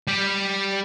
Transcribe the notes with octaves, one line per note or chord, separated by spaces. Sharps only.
G3 G4